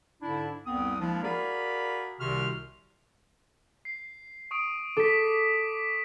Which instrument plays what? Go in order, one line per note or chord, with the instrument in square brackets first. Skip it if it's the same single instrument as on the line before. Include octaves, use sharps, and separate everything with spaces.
[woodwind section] G#2 D3 D4 E4
C2 F2 B3 C4 D#6
F3 G#3 A#3 D4 E4
F#4 G#4 A#4 D5 F5 B5
C2 C3 D#3 F#4 C6 F6
[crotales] C7
C#6 D#6 D7
[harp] A4 [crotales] D6 B6